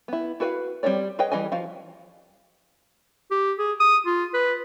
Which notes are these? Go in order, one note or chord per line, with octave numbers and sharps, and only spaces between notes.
B3 E4
E4 F#4 B4 C#5 F5
G3 C4 E4 C#5 D5
G#4 B4 C#5 D#5 G5
E3 G3 D#5 G#5
F3 F#4 F5
G4
G#4
D#6
F4
B4